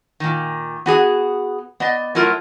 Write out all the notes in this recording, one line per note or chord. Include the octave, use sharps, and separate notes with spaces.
A#2 D#3
B3 F#4 G#4
B3 D5 D#5
F#3 A3 E4 F4 A#4